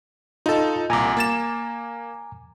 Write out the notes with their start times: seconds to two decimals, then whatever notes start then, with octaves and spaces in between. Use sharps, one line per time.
0.46 D#4 F4 A4 A5
0.90 C2 A#2 G#5 A#5 D6
1.17 A#3 A6 E7